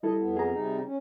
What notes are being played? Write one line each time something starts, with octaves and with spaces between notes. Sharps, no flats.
G3 E4 A4 D#5
F2 B3
G#4 A#5
C3 G3 D#4
C#4